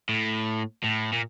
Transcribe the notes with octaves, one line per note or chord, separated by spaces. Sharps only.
A2
A2
A#2